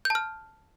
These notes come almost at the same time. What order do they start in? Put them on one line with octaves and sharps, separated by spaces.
G6 A5 F6